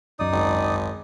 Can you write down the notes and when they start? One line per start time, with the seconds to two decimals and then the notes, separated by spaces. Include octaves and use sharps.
0.19 C#2 F#2 D#4 D5 D#6
0.32 G#1